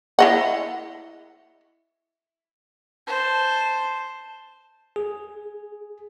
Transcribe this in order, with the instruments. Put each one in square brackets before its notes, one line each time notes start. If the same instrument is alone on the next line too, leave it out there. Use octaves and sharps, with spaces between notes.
[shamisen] E4 D#5 F#5
[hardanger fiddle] C5 A5
[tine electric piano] G#4